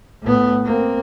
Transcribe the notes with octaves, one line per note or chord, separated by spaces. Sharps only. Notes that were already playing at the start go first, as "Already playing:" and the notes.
A2 B3
A#3 C4